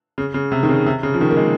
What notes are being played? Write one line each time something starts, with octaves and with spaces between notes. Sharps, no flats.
C#3
C#3
C3
D#3
C#3
C3
C#3
F3
D#3
A#3
G#3